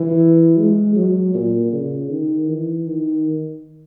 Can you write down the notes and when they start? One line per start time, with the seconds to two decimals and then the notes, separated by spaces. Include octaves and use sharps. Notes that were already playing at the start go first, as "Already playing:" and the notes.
Already playing: E3
0.58 G#3
0.96 F#3
1.34 A#2
1.72 C#3
2.10 D#3
2.48 E3
2.86 D#3